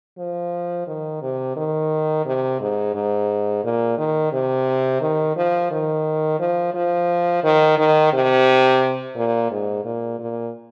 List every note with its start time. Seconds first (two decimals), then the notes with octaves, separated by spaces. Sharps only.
0.18 F3
0.87 D#3
1.22 C3
1.57 D#3
2.25 C3
2.60 G#2
2.94 G#2
3.64 A#2
3.98 D#3
4.32 C3
5.01 D#3
5.36 F3
5.71 D#3
6.40 F3
6.74 F3
7.44 D#3
7.78 D#3
8.13 C3
9.16 A#2
9.51 G#2
9.85 A#2
10.20 A#2